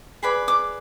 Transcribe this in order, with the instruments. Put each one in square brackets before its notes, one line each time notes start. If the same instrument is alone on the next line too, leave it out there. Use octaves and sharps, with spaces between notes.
[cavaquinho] G#4 B4 D5 B5
D6